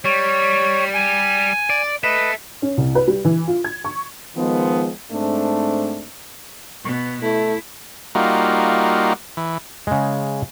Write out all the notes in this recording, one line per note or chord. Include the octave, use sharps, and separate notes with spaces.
G3 C#5
G#5
D5
A4 B4 D#5 E5
C#4
C2
B4
G3
E3
F4
G#6
C#6
D#3 F3 G#3 B3
G#2 A3 C4 D4
B2 B3
A3 E4
G3 A#3 D#4 F4 F#4
E3
C#3 G#3